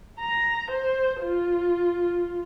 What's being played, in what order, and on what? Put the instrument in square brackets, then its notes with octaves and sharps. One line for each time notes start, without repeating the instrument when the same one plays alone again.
[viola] A#5
C5
F4